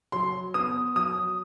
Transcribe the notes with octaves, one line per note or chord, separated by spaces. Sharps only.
F#3 C6
B3 D#6
F#3 D#6